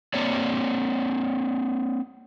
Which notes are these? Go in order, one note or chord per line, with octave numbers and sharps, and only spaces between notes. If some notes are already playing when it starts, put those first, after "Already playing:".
A#3 C4 C#5 D5